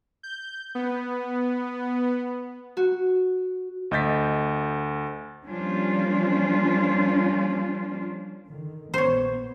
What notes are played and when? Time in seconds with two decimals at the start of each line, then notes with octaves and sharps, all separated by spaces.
0.23 G6
0.75 B3
2.77 F#4
3.91 D2 D#5 G6 A6 B6
5.45 F3 G3 A#3 C#4 D4 F4
8.47 D3 D#3
8.94 A#1 B3 C5 C#5